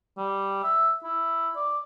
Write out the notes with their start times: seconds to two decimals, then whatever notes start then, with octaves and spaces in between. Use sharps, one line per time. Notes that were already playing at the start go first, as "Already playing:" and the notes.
0.17 G3
0.63 E5
1.03 E4
1.56 D5